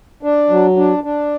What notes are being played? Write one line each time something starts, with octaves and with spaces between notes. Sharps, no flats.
D4
F#3
D4
D4